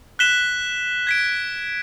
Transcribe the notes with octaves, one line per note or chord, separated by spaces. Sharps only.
F#6 B6 E7 G7
G#6 B6 D7